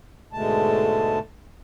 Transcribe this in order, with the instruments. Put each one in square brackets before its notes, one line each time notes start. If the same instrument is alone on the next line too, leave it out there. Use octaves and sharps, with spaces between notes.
[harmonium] G#2 B2 D3 G#3 A3 A5